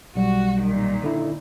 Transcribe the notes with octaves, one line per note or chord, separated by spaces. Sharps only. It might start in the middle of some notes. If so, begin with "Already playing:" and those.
B1 G3 F#4
A#2 D#3
D3 D#4 E4